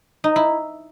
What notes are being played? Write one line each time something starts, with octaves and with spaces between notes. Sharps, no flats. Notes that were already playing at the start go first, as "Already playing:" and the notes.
D#4
E4